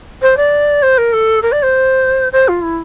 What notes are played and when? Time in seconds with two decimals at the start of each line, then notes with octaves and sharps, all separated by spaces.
0.22 C5
0.37 D5
0.82 C5
0.98 A#4
1.13 A4
1.42 A#4
1.52 D5
1.63 C5
2.32 C5
2.48 F4
2.62 E4